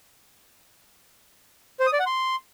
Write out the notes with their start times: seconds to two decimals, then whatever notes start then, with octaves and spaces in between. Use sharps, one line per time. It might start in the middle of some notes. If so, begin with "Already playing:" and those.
1.80 C5
1.86 D#6
1.93 D5
2.00 F#5
2.06 C6